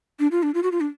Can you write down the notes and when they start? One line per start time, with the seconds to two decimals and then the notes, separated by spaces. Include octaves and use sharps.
0.20 D4
0.31 F4
0.43 D4
0.54 F4
0.63 F#4
0.72 F4
0.81 D4